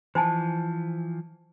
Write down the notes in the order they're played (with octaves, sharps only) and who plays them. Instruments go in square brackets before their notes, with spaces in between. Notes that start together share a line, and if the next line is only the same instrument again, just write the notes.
[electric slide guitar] E3 F3 [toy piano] C5 G#5 A5